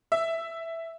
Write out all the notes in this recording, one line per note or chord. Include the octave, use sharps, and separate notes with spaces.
E5